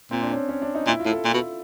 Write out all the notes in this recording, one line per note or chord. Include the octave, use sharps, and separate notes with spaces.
A#2 C4
D4
C#4
C#4
D4
D#4
A#2 E4
F4
A2
A4
A#2
B2
A4